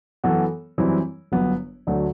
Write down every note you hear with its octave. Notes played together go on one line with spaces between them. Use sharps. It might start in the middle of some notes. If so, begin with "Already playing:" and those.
F#2 E3 B3 F#4 A4
F#2 E3 G3 C4 E4
G1 F#2 F#3 B3
D2 D3 F#3 A3